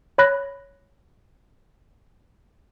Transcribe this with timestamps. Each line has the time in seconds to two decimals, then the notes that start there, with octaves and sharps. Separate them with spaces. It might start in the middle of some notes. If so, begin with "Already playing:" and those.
0.18 C#5 B5 F#6 A#6